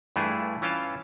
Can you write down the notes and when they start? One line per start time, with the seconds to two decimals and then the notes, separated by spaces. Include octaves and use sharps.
0.16 G2 E3 A3 E4 F4 G#4
0.62 E3 C#4 F4 F5 G5 A5